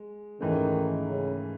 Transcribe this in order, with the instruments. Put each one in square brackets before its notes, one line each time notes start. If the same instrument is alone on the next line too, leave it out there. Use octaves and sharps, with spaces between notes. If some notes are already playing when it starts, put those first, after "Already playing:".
Already playing: [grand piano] G#3
[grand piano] G#2 E3 A3 C#4 [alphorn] D#3
[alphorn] C#3